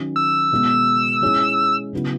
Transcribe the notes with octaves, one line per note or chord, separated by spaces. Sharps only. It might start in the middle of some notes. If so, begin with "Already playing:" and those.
Already playing: D#3 F#3 C#4
E6
B2 G#3 B3
G#3 C#4 E4 G#4 C#5
C#3 F#3 B3 E4